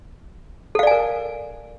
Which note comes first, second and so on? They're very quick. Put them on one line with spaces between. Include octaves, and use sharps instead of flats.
A4 F5 D5 G#5 A#4